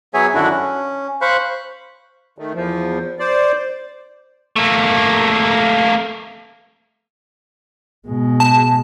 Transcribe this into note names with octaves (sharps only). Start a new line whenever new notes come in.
F#3 B3 G#4 C#5 E5 G#5
F#2 D3 D#3 D4 E4 F#4
C#4
C5 F5 B5 C#6 F#6
D#3 A3
E2 F3
C5 D5
A3 A#3
B2 G#3
A5